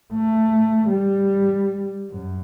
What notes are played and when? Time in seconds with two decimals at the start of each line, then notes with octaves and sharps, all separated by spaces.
0.13 A3
0.89 G3
2.10 F#2